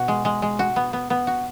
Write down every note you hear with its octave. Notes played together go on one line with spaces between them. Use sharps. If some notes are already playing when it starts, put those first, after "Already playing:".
Already playing: B2 F#4
G#3
G#3
G#3
F#4
B3
B3
B3
F#4